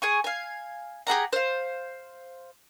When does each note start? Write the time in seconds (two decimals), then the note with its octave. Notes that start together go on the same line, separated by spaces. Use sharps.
0.02 G#4 G#5 C#6
0.24 F5 G#5
1.07 G4 G#4 F#5 A#5
1.33 C5 F5